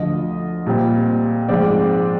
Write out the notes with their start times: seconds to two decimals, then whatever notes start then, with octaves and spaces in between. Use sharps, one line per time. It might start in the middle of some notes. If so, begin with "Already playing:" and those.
Already playing: D2 D3 F3 D#5
0.66 A#2 G3 C4
1.48 G#2 F3 G#3 C4 D5